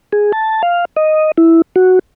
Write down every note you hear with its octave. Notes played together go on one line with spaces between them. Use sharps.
G#4
A5
F5
D#5
E4
F#4